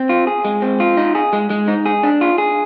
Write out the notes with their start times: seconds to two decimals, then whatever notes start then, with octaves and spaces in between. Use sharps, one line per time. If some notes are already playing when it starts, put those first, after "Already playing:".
Already playing: C4
0.09 F4
0.27 G#4
0.45 G#3
0.62 C4
0.80 F4
0.97 D#4
1.15 G#4
1.33 G#3
1.50 G#3
1.68 D#4
1.86 G#4
2.03 D4
2.21 F4
2.38 G#4